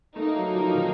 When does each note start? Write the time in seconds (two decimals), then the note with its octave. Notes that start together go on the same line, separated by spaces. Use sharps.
0.16 A3 A#3 D#4 A#4
0.36 F#3
0.55 F3
0.75 D#3